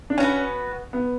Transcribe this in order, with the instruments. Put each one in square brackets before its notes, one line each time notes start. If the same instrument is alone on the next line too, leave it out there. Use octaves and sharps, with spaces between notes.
[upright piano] D4
[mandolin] B3 F#4 B4 [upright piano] C#4
[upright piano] B3